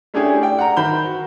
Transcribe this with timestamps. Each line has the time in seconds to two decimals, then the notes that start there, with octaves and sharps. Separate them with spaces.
0.14 A3 C#4 D4 E4 G4 G#4
0.41 D5 G5
0.59 F#5 A#5
0.77 D#3 C5 B5 G6 G7
1.04 F#4